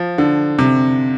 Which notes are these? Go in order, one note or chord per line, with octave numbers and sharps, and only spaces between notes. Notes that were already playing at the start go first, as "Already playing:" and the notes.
Already playing: F3
D3
C3